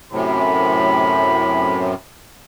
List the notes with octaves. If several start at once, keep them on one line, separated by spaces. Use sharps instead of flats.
F#2 A2 C3 B5